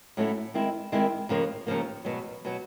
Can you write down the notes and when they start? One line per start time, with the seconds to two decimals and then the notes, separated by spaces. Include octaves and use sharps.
0.17 A2 F#3 A3 C#4 E4
0.54 D#3 G#3 C4 E4
0.92 D#3 G#3 C4 E4
1.29 D#2 C#3 F3 A#3
1.66 D#2 C#3 F3 A#3
2.05 E2 B2 F#3
2.45 B2 F#3